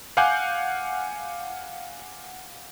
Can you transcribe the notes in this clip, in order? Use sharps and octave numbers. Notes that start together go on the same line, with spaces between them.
F5 F#5 G#5 D6 F#6 G6